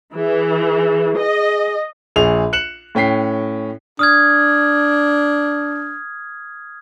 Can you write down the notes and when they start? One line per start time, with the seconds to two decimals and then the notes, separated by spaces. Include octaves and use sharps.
0.15 E3 G#4
1.17 D#5
2.16 A#1 G#4 F7
2.53 F#6 C#7 E7 F#7
2.95 A2 C#4 G5 B6 C7
3.99 D4 D#6 F6 G#6